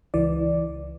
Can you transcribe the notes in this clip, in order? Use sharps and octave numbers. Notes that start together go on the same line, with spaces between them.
C#2 E3 D5